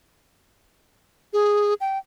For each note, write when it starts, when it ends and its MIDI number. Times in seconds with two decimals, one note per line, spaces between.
1.33 1.74 68
1.81 1.98 79